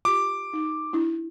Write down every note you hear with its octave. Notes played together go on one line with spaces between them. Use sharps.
F4 G4 D6
D#4
D4 E4